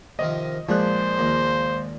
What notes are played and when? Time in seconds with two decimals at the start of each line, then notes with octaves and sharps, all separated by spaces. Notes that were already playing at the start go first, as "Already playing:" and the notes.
0.19 C3 D#3 F3 D#5
0.68 A#2 F3 G#3 D4 C5 F#6
1.18 D#2 A#2